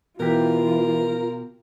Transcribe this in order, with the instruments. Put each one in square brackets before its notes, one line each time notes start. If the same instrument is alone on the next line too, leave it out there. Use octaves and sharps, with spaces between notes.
[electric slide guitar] B2 G4 [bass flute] E3 [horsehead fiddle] F4 [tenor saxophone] A#4